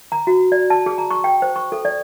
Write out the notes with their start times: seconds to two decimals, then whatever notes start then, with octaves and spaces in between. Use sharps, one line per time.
0.12 A#5
0.27 F#4
0.52 D5
0.70 A5
0.86 G#4
0.98 A#5
1.10 C#6
1.24 G5
1.42 C5
1.56 C#6
1.72 A4
1.85 D5